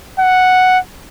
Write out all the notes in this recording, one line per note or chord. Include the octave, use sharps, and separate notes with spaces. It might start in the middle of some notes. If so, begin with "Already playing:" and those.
F#5